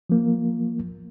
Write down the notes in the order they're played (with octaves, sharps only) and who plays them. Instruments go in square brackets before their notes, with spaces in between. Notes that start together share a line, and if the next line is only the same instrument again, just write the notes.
[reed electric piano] F3 A#3